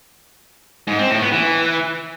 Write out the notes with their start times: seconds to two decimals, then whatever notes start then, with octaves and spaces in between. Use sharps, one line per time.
0.87 G#2
0.99 C4
1.10 A2
1.21 B3
1.32 E3